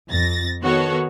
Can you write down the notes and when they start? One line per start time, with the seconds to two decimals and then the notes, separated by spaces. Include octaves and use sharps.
0.11 F2 A6 A#6
0.63 D#3 B3 F#4 A4 C#5